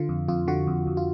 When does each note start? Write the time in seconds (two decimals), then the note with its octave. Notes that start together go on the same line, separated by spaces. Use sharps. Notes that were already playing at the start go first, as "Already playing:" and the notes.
Already playing: D3 F4
0.09 F2
0.28 F2 F4
0.48 D3 F#4
0.67 F2
0.87 F2
0.97 F4